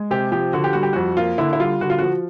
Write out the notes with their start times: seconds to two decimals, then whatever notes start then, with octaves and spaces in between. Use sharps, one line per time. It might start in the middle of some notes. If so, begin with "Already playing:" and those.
Already playing: G#3
0.11 C3 G4
0.32 F3 G4
0.53 D3 F#4
0.64 G4
0.73 G3 F#4
0.83 G4
0.93 F2 F#4
1.17 A#3 F4
1.38 D3 E4
1.53 E4
1.60 G3 F4
1.81 D3 F#4
1.90 F4
1.98 F3 F#4